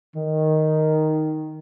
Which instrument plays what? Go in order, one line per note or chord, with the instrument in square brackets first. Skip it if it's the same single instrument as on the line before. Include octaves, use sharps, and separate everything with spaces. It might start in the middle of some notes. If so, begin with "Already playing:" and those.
[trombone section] D#3